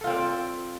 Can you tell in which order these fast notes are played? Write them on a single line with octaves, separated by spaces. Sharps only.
A4 F4 C4 D5